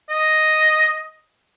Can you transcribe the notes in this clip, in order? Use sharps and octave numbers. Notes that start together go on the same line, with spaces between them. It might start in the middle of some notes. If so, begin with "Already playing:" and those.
D#5